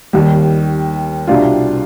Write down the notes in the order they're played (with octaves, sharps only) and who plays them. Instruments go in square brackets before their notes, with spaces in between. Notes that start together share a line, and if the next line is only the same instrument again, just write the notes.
[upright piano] D#2 D#3 G3
C2 B2 G3 D4 F4